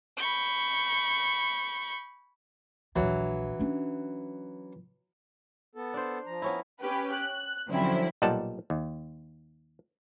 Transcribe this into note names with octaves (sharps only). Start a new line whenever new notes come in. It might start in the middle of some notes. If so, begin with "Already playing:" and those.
B5 C#6 G6
A#1 D#2 E3 F#3
C#4 D4
B3 A4
D4 C5
F3 A#5
B3 C#4 E4
C#4 G4 B4
F#6
D3 F3 F#3 C4 C#4 E4
B1 A#2 G3 D#5 F#5 A5
D#2